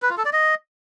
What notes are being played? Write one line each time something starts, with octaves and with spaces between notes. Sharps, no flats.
B4
F4
A4
D5
D#5